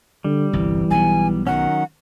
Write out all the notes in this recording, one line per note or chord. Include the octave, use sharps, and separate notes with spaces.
D3 G3
G1 C2 E3
B1 B3 G#5
D#3 F#3 C#4 F#5